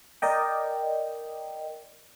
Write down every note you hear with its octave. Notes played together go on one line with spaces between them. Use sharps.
A#4 D5 D#5 G5